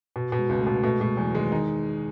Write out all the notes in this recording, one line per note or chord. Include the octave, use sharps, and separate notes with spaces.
B2
B2
G#3
C#2
A3
B2
B2 A3
B2 G#3
E2 F#3
D#3 G#3
D#3 D#4